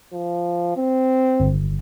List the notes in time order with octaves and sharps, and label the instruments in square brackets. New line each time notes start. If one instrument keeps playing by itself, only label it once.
[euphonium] F3
C4
[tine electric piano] G1